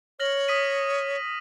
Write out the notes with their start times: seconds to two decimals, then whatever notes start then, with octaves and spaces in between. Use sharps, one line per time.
0.20 C#5 F6 A#6 F#7
0.48 D#6 B6 D#7